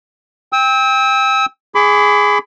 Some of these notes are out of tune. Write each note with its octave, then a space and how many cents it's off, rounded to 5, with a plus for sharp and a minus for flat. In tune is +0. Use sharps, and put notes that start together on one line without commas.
G5 +20 E6 -30
G#4 +0 B5 +30 D6 -25